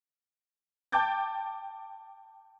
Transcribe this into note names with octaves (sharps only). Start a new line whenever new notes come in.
G5 A5 D6 G6 A6